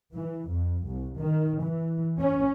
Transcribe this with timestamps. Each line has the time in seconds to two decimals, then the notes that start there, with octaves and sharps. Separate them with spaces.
0.14 E3
0.49 F2
0.86 C2
1.18 D#3
1.62 E3
2.20 C#4